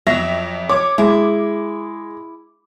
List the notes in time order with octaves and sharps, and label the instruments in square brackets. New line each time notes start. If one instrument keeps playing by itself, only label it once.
[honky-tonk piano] F2 E5 A#6 [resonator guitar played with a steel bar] F#3
[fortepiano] C#5 [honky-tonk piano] D6
[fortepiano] G#3 [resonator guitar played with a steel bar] E4